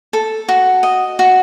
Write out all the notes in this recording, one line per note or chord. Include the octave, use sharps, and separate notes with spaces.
A4
F#4
D#5
F#4